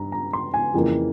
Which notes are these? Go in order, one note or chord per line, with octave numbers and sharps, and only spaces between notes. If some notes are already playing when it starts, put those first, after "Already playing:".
Already playing: G2 A#5
A#5
C6
G#5
F2 C#3 E3 A#3